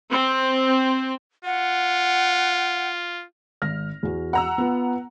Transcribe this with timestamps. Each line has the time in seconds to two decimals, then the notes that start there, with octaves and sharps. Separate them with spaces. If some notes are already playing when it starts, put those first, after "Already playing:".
0.11 C4
1.45 F4 F#5
3.62 G#1 F6 A#6
4.03 E2 F#4
4.33 F#5 A#5 E6
4.58 B3 F4